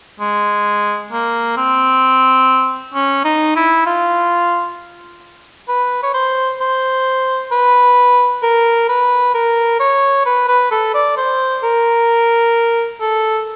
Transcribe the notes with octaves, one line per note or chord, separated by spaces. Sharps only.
G#3
A#3
C4
C#4
D#4
E4
F4
B4
C#5
C5
C5
B4
A#4
B4
A#4
C#5
B4
B4
A4
D5
C5
A#4
A4